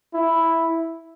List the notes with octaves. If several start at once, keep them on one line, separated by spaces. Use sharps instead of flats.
E4